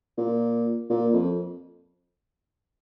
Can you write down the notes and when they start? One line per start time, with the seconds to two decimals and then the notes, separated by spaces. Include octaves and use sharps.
0.18 A#2
0.90 A#2
1.13 F2